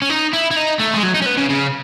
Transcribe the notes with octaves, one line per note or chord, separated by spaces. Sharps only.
C#4
D#4
E4
E4
D#4
A3
G#3
F#3
D#4
C#4
B3
C#3
C#3